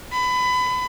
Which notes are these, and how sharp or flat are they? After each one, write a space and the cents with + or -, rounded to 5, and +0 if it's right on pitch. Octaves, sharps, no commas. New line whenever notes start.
B5 +25